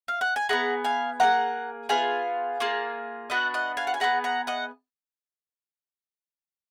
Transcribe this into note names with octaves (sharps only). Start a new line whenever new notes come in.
F5
F#5
G#5
B3 D#4 G#4 F#5 A#5
F5 G#5
A#3 D#4 G#4 F#5 A#5
B3 F4 G#4 F5 G#5
A#3 F4 G#4
B3 D4 F#4 D#5 F#5
D#5 F#5
F5 G#5
F#5
G#5
B3 D#4 G#4 F#5 A#5
F#5 A#5
D#5 F#5